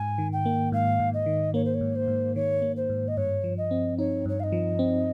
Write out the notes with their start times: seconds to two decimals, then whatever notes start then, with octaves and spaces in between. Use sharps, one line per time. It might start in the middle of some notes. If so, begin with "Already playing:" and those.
Already playing: G#2 G#5
0.18 D#3
0.32 G5
0.46 A#3
0.72 G#2 F5
1.00 G#2
1.13 D#5
1.26 D#3
1.54 A#3 C#5
1.64 C5
1.74 C#5
1.81 G#2
1.95 C5
2.08 G#2
2.35 D#3 C#5
2.62 A#3
2.76 C5
2.90 G#2
3.08 D#5
3.17 G2 C#5
3.44 F3
3.57 D#5
3.71 C4
3.98 D#4 C#5
4.26 G2 C#5
4.39 F5
4.43 D#5
4.52 F3
4.79 C4